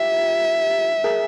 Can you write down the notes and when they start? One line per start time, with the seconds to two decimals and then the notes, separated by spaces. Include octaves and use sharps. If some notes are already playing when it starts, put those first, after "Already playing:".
Already playing: F4 G4 E5
1.04 G#4 A#4